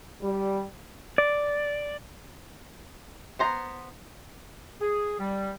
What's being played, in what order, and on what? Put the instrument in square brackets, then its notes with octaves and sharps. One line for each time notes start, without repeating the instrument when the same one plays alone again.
[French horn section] G3
[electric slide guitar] D5
[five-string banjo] B3 C5 A#5
[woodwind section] G#4
G3